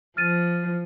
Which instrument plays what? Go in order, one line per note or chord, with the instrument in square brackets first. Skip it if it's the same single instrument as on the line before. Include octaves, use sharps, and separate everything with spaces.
[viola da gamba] F3 [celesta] F6 A6 D#7